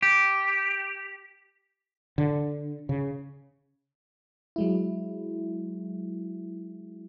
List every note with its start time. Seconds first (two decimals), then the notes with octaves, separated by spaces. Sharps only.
0.03 G4
2.18 D3
2.89 C#3
4.56 F#3 G#3 E4